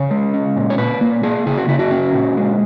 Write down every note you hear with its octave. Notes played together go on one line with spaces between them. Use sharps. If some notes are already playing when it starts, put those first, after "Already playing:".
Already playing: C#3 C#5
G#3
C#4
A#2
C#5
A#2 B4
A#3
A#3 G#4
C#3 G#4
F#4
C#3 E4
F#4
C#4
A#2
G#3